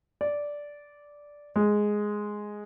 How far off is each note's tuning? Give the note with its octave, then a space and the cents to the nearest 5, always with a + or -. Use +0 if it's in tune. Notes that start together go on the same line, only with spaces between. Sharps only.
D5 -5
G#3 +5